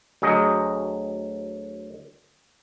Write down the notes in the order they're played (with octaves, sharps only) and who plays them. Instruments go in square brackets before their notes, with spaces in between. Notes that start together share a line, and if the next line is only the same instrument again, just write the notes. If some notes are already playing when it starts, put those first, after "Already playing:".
[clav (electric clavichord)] D2 F#3 G#4 D#5